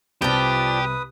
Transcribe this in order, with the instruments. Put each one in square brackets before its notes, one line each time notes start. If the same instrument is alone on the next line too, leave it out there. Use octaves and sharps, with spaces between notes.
[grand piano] C2 C3 [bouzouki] F3 D4 [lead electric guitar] G4 [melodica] B4 D#6